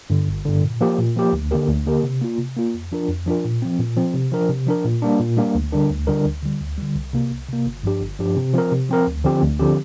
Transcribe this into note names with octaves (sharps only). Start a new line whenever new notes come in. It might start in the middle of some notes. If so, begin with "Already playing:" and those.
G2 D3
G1
G2 D3
A#2
F3 A#3 G4
A#2
F3 A#3 G4
D2
D3 A#3 G4 A#4
D2
D3 A#3 G4 A#4
C3
A#3 F4
C3
A#3 F4
F2
F3 D4 F4 A#4
F2
F3 D4 F4 A#4
A#2
F3 C4
A#2
F3 C4
C3
F3 D4 A#4
C3
F3 D4 A#4
A#2
G3 A#3 D4
A#2
G3 A#3 D4
D2
D3 G3 D4 A#4
D2
D3 G3 D4 A#4
D2
D3 G3
D2
D3 G3
C2
C3 A#3
C2
C3 A#3
G1
G2 F3 D4 G4
G1
G2 F3 D4 G4
C3
F3 C4 A#4
C3
F3 C4 A#4
D2
D3 F3 C4 G4
D2
D3 F3 C4 G4